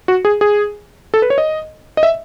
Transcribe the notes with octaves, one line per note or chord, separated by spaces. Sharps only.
F#4
G#4
G#4
A4
B4
C#5
D#5
D#5
E5